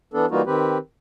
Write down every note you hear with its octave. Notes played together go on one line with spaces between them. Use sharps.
E3 B3 D4 A4
E3 G3 A#3 D#4 F4 F#4
D#3 C4 G4 B4